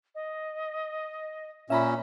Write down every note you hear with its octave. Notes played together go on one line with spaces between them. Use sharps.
D#5
A#2 C#4 E5 A#5 B5